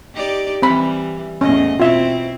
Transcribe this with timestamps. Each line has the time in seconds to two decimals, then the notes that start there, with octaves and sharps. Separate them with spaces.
0.15 D#4 G4 D5
0.62 E3 G3 C4 B5
1.41 E2 A2 C#4 D#5
1.80 B2 C4 E4 F4 E5